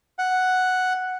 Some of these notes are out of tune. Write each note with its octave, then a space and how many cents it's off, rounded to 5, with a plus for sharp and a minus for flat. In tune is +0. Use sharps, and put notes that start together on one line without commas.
F#5 +0